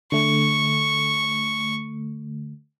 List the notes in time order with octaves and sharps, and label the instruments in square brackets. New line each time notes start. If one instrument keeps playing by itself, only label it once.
[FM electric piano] D3 A3 [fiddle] C#6